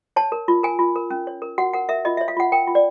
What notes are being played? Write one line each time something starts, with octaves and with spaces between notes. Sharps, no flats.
C#5 A5
A#4
F4
A#4 G#5
F4
A#4
C#4
C#5
A#4
F#4 F#5
A#4 F#5
A#4 E5
F4 D#5
C#5 E5
F5
F4 F#5
A#4 G5
F4
D5